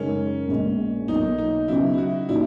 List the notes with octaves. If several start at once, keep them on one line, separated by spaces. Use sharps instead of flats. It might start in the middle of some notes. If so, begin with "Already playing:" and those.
Already playing: F#2 C#3 G#3 C#4 D#4 A#4
A#1 A#2 G#3 B3
B1 B2 A#3 D#4
D#4
C#3 F#3 B3 E4
E4
F#4
A#2 A#3 D#4 E4 F#4